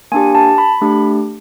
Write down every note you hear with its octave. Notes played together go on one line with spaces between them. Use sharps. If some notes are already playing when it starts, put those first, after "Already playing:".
A#3 D4 G4 G#5
A5
B5
A3 D4 G4